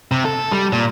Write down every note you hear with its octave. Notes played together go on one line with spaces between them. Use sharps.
C3
A4
G3
A#2